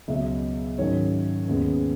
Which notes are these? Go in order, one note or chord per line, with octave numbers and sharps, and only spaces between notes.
C#2 B2 F#3 E5
G#2 D#3 F#3 C#4 C#5
D#2 C#3 G#3 B3